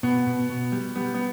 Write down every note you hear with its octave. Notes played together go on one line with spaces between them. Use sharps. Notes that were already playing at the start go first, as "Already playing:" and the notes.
B2 B3
B2
B2
G3
G3 B3
B3